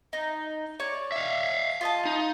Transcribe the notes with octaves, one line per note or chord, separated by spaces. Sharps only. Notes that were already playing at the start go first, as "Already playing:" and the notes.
D#4
C#5 D5
E5 F5
F4 D#5 A5
D#4